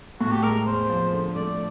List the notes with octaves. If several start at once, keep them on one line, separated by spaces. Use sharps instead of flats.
A2 F#4
G4
G#3 A#4
E2 C5
F3
D3
A3 D5